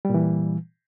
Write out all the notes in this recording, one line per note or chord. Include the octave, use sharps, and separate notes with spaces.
A#2 E3 G3